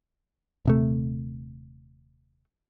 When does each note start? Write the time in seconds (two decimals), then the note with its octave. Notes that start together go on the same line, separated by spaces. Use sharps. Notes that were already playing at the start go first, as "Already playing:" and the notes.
0.65 D#1 C3 A3